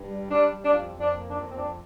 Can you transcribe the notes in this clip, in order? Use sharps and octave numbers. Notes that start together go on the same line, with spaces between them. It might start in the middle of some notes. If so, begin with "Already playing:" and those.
Already playing: G2
G3
G3 D4
G3
D4
F2 F4
F2
D4
A#3
D4
F2
C4
F2 D4